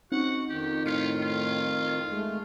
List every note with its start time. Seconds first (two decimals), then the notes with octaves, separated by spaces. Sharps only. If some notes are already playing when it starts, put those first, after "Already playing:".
0.12 C4 C#4 D#4 F#4 F#5
0.50 F2 D#3 G4
0.86 A2 F4 F6 B6 C#7
1.23 F4
2.12 G#3 A3